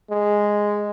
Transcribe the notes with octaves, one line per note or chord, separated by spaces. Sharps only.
G#3